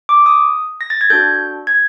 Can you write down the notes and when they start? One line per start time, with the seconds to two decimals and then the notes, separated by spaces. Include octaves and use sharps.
0.09 D6
0.26 D#6
0.81 A#6
0.90 A6
1.01 G#6
1.10 D4 F#4 A4 G6
1.67 G#6